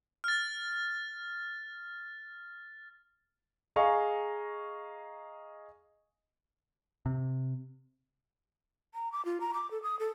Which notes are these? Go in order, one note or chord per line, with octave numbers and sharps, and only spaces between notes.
F6 A6
G#4 D#5 F5 A#5 C#6
C3
A#5
D6
F4
A#5
D6
A4
D#6
A4